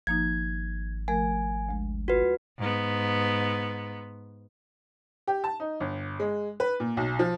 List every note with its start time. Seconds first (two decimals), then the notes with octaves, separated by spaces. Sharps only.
0.07 G#1 F3 A#3 D#4 G#6
1.08 F3 A3 A#4 G#5
1.69 D2 G#3
2.08 F4 F#4 B4
2.58 G#2 B3
5.27 G4
5.44 A5
5.60 D#4
5.80 G1
6.20 G#3
6.60 B4
6.80 A#2
6.97 B1
7.19 F3